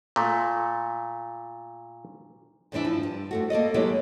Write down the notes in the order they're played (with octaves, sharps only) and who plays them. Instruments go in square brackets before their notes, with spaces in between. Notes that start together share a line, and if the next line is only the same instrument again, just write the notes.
[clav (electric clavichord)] A#2 A3
[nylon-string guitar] E2 G#2 E3 D4 E4
F3
G2
F2 A3 F#4
A#3 A4 D5 D#5
F#3 G#3 A#3 E4 G4 D#5